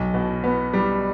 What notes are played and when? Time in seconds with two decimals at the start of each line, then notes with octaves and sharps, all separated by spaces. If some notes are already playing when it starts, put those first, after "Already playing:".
Already playing: B1
0.14 B2
0.44 B3
0.74 G3